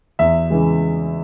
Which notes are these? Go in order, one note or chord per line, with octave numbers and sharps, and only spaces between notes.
E2 E5
C#3 E3 G#3